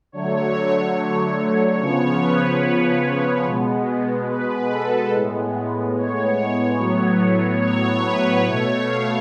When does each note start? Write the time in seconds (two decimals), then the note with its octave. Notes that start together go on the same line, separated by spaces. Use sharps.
0.12 D3 F#3 A3 C#5
1.78 C#3 F3 B3 C#5
2.20 B4
3.45 B2 G#3 B3
4.28 B4
4.71 A4
5.13 A2 G#3 B3
5.96 C#5
6.78 A2 F#3 B3
7.61 C#5
8.04 B4
8.45 B2 A3 C#5
8.86 F5